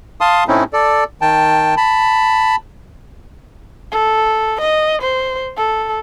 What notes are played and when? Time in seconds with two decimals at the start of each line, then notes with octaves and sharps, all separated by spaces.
0.21 F5 A5 C6 D#6
0.48 A2 A3 C4 C#4 D#4 E4
0.73 A4 D5
1.21 D#3 G5 A5
1.77 A5 B5
3.92 A4
4.61 D#5
5.02 C5
5.57 A4